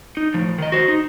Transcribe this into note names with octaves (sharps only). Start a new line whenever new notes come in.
D#4
A2 F3
D#3 D#5
F#4 C5
D#4